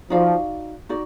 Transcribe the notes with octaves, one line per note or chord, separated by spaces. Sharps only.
F3 D#4 F#4 D5 F5
D#4 F#4 D5